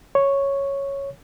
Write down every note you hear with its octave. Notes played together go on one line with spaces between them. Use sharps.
C#5